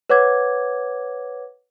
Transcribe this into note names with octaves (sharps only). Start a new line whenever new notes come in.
B4 C#5 F#5 D6 G#6